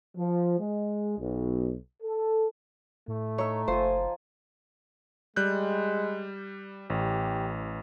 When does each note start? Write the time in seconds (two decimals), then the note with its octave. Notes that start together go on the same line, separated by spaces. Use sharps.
0.17 F3
0.60 G#3
1.19 B1
2.03 A4
3.08 A2 A3
3.38 D#4 C#5 E5
3.68 F#1 F3 C5 G#5
5.36 G3 G#3 F#6 G6
6.90 A1 G4